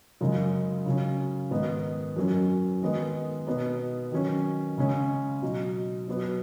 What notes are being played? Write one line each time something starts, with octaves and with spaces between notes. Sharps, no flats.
F#2 C#3 G#3 D#4
C#3 F#3 C#4
G#2 D#3 B3 D#4
F#2 F#3 C#4
D#3 G#3 B3 D#4
B2 B3 D#4
D#3 F#3 C#4
C#3 G#3 C#4
B2 F#3 D#4
B2 F#3 B3